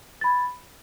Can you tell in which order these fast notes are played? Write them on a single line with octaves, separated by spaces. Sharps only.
A6 B5 G#6